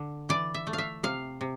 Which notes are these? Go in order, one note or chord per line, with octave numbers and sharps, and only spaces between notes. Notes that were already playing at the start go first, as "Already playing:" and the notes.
Already playing: D3
E3 D5
E5
A3
F5
E5
C3 F5
C3